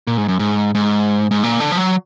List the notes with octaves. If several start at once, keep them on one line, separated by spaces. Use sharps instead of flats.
A#2
G#2
F#2
G#2
G#2
G#2
A#2
D3
F3
F#3